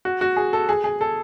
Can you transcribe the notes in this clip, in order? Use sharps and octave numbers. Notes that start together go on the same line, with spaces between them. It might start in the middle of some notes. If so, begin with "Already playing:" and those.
F#4
F#4
G#4
A4
G#4
G#4
A4